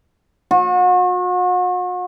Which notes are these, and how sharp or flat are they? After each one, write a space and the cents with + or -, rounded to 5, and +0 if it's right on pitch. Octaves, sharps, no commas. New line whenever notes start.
F#4 -40